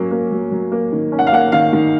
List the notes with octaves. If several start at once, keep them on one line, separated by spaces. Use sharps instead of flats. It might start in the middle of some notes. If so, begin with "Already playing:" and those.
Already playing: F#3 A#3 C#4
A#3
F#3
F#3
A#3
D#3
C#4
F#5
F5
A#3 F#5
D#3 F5
D#3